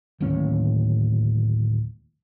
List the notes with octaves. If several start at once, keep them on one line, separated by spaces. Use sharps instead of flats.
D1 D#2 A2 C#4